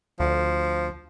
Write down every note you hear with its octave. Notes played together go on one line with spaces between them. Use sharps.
D2 F3